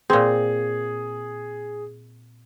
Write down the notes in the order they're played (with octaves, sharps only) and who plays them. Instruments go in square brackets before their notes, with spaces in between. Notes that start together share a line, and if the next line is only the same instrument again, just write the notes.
[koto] A#2 C4 [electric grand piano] G#4